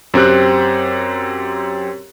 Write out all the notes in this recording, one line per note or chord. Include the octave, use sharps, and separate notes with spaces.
F#2 C4 G4 F#6